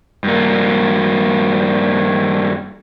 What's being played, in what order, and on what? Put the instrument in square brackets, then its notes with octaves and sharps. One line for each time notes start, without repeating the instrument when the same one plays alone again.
[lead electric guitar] G2 A#3